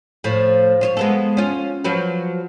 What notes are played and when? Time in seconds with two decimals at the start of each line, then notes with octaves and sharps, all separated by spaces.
0.24 A2 F3
0.81 F4 C5 C#5
0.97 G#3 B3 A4
1.37 C#4 F4
1.84 F3 F#3 B4